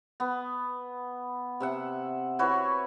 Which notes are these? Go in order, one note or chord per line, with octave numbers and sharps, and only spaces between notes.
B3
C3 E5 F#5
E4 F#4 B4 C#5